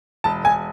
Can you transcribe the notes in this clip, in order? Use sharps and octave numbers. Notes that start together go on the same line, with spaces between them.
E1 A5
E1 G#5